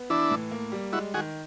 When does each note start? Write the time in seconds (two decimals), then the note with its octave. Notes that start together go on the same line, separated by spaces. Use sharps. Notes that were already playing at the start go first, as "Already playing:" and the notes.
Already playing: B3
0.10 E3 D4 E4
0.31 A2
0.51 A#3
0.72 G3
0.92 G#3 E4 F#4
1.14 D#3 F#4 G#4